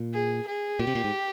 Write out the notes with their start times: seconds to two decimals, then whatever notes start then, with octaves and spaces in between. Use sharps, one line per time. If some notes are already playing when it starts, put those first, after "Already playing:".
Already playing: A#2
0.14 G#4
0.47 G#4
0.79 A#2 G4
0.87 C3
0.95 A#2
1.04 G#2